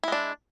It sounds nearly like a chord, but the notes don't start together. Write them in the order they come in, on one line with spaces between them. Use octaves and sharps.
E4 G#3 D4